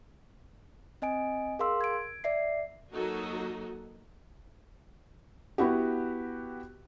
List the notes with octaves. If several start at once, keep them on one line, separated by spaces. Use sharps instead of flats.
C4 D#5 G#5 D7
G#4 A#4 F5 C6 E6
G#6 D7
D5 E5 C7
F#3 A#3 D#4 F#4 A4 D#5
B3 E4 F#4 G4